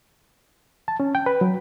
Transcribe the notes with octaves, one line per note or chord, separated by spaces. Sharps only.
A5
C#4
G5
B4
F#3